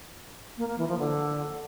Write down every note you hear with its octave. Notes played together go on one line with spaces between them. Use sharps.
A#3
A#3
E3
F3
D3